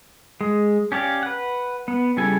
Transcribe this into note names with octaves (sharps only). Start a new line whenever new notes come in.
G#3
C#4 G4 D5 F5
B4 F#5
B3
C#3 G3 E4 A4 G#5